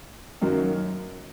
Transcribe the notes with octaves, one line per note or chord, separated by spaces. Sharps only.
F#2 D#3 F#3 A#3